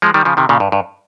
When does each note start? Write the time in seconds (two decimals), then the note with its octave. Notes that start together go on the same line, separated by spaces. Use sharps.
0.02 F3 G#3
0.14 D#3 G3
0.25 C#3 F3
0.37 C3 D#3
0.49 A#2 C#3
0.60 G2
0.72 G2